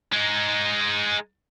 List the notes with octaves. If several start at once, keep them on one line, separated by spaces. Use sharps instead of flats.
G#3 D#4